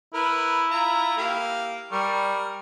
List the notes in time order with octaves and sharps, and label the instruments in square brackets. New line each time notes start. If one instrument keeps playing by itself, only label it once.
[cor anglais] E4 [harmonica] A#4 B4
[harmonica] F4 A#5
A#3 G4 F5
[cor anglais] G3 [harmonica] A#4 C#6